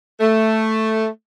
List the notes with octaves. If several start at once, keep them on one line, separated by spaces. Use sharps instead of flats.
A3